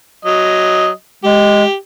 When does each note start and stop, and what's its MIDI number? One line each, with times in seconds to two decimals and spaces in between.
0.25 0.89 54
0.25 0.89 75
1.24 1.64 56
1.24 1.74 67